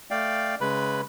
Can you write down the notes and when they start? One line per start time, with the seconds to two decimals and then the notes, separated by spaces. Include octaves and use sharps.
0.11 A3 D5 F5 G5
0.61 C#3 G#3 B4 B5